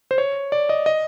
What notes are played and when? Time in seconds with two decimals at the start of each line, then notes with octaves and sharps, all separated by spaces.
0.11 C5
0.18 C#5
0.52 D5
0.69 D#5
0.86 D#5